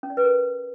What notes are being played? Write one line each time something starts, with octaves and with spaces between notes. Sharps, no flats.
C#4
D5
B4
A#4